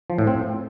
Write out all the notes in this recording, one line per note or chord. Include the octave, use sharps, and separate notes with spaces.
F3
A2
C4